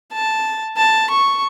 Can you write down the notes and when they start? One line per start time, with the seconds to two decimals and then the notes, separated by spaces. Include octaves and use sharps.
0.13 A5
0.77 A5
1.10 C#6